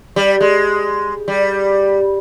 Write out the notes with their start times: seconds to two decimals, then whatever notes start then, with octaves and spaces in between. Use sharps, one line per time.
0.16 G3
0.41 G#3
1.28 G3